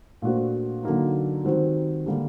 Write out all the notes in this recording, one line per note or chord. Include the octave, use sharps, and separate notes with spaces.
A#2 A3 D4 F#4 C5
D3 F#3 A#3 D#4
D#3 G3 C4 F#4 C5
D3 G3 A#3 D4